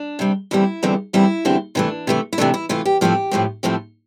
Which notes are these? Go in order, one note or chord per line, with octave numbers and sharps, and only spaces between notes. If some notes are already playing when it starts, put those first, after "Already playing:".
Already playing: D4
C3 G3 C4
E2 D3 G3 C4 E4
E2 D3 G3 C4
E2 D3 G3 C4 E4
E2 D3 G3 C4
C3 E3 A3 D4
C3 E3 A3
E4
C3 E3 A3 D4
E4
C3 E3 A3 F4
G4
A2 F3 A3 C4 G4
A2 F3 A3 C4
A2 F3 A3 C4 G4